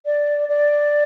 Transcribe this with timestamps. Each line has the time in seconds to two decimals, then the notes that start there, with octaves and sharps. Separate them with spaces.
0.06 D5
0.49 D5